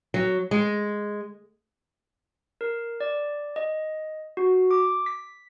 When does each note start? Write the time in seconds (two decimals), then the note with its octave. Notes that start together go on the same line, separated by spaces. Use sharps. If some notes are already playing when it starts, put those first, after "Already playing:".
0.14 F#3
0.51 G#3
2.61 A#4
3.00 D5
3.56 D#5
4.37 F#4
4.71 D6
5.06 B6